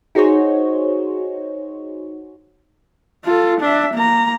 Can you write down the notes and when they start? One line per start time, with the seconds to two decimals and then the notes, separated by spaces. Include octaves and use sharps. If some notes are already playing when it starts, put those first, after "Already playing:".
0.15 D#4 F#4 G#4 C5 C#5
3.24 F4 A4
3.60 D4 E5
3.94 A#3 A#5